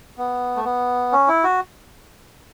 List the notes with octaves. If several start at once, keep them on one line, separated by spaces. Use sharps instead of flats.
B3
A3
B3
C#4
E4
F#4